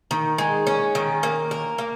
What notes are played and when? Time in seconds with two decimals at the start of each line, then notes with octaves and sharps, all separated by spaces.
0.11 D#3
0.38 G#3
0.67 C#4
0.95 D#3
1.23 A#3
1.51 A#4
1.78 A#3